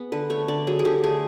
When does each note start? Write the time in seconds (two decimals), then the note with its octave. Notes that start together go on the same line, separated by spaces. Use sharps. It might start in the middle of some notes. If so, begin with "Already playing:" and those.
Already playing: B3 G#4
0.12 D3 B4
0.30 A3 C#5
0.48 D3 D5
0.67 F#3 G#4
0.79 G#4
0.85 D3 G4
1.04 A3 G#4